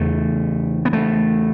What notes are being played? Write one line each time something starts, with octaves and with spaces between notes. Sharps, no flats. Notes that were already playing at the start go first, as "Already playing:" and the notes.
Already playing: E2 C#3 A3
B3
A3